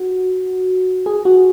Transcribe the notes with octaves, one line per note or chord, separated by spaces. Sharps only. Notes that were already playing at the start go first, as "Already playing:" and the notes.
Already playing: F#4
G#4
F#4